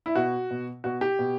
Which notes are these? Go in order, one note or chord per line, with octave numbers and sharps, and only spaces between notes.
E4
B2 F#4
B2
B2 F#4
G4
B2